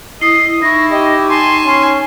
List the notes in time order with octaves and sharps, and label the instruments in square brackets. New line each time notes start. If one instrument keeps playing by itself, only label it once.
[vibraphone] E4 D#6 [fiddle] D#5 [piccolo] C7
[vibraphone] D#4 C#6 [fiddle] E4 [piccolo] A#6
[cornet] G4 [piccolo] D#5
[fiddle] G#5 A5 [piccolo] C6
[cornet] C#4 [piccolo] C6